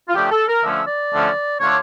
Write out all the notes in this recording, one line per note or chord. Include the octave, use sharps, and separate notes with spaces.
F4
C#3 F3 A3 D4 G4
A4
A#4
D3 F3 A3 C#4 E5
D5
D3 F3 A3 C#4
D3 A3 D4 F4 C#5